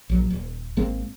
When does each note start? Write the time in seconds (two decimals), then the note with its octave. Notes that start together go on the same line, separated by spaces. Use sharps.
0.09 A#1 F#3
0.30 D#1
0.77 G#1 G#3 A#3 C4